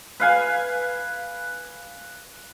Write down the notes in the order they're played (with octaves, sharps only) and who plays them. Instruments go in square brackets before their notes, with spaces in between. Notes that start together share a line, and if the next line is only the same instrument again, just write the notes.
[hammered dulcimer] B4 F5 G#5